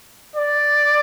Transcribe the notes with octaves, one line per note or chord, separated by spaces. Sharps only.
D5